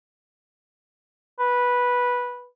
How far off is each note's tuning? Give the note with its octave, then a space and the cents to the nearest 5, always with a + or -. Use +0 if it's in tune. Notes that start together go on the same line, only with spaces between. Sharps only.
B4 -10